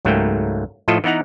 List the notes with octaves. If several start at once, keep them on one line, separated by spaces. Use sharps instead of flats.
C#2 G#2 F#3 A3 A#3 G5
A2 F3 E4 F4 A4 D#5
E3 B3 D#4 F#5 A#5